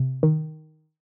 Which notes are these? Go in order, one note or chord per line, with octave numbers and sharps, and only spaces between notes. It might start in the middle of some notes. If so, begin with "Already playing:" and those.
Already playing: C3
D#3